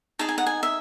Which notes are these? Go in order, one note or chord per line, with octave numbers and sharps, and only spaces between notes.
D#4 G#4 D#5 A5
G#5
F#5
G#5
E5